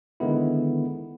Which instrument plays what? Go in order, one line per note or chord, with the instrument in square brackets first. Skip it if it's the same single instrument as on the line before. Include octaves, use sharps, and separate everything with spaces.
[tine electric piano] D3 D#3 G#3 B3 E4